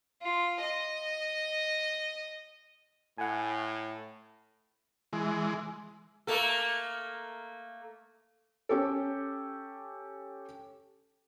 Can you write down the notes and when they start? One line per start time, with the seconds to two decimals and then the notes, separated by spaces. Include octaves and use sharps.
0.23 F4
0.62 D#5
3.18 A2 F#5 G#5
5.13 E3 G#3
6.27 A3 A#3 A4
8.69 C#4 G4 A4